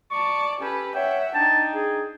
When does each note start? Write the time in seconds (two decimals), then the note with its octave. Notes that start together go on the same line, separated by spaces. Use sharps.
0.11 D5 A5 C#6
0.60 C#4 G4 A4 B4
0.95 C#5 E5 F#5 G5
1.35 D4 D#4 G5 A5
1.74 G#4